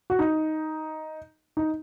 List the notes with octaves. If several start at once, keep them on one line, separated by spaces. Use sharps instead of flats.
F#4
D#4
D#4